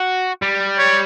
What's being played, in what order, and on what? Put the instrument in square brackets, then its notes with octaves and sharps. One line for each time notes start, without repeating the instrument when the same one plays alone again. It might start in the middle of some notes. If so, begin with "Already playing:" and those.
Already playing: [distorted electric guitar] F#4
G3
[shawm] C#5